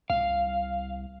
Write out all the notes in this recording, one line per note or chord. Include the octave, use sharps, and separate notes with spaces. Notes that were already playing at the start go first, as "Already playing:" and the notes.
C2 F5